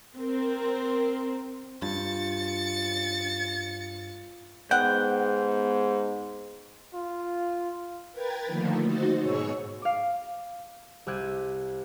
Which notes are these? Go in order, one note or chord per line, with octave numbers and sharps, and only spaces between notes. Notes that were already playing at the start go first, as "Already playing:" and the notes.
C4 A#4
G2 F4 A6 C#7
G#2 B3 F#5 G5
F4
A#4 B4 G5 G#6 A6
D3 D#3 F3 A3 A#3
D#4 F#4 C5 A6
G#2 B2 G#4 C#5 C#6 E6
F5 D6
C2 G4 E6 F#6 G#6 D#7